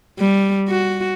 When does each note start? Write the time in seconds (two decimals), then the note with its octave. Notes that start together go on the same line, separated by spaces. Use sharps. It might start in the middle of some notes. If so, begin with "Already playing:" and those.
0.19 G3
0.68 F#4